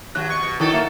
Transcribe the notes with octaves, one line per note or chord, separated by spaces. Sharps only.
D#2 F#3 F#6
B2 C#6
B2
D#3 F#3 E4 A4
A#3 E5